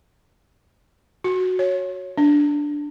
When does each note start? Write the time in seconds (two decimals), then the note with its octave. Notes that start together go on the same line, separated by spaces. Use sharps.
1.24 F#4
1.59 C#5
2.18 D4